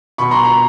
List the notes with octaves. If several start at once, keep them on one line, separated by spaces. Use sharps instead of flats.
B2 B5 C#6
A#5 C6
A#5 C6